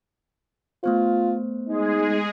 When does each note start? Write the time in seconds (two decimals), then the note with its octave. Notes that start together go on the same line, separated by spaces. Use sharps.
0.84 A3 B3 F4 C5
1.68 G#3 D#4 G#4